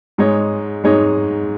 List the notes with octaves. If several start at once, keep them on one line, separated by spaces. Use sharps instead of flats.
G#2 G#3 D#4 C#5
G#2 G#3 D#4 C#5